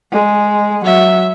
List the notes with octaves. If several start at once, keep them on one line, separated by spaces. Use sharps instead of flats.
G#3
F#3 E5